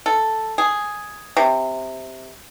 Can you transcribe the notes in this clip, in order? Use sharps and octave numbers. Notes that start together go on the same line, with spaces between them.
A4
G#4
C3